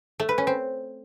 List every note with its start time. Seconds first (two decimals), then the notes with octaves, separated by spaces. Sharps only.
0.20 A3
0.29 B4
0.38 C#4
0.47 C4